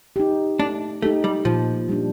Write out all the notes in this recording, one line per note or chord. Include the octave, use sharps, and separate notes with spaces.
D#4 G4
A3 D4
A3 D#4 G4
G3
A#2 F3
G3 D4